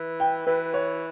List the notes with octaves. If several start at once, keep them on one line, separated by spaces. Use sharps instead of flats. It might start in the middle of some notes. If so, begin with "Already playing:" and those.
Already playing: E3
G5
E3 B4
C#5